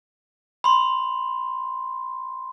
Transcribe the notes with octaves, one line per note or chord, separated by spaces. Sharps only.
B5 C6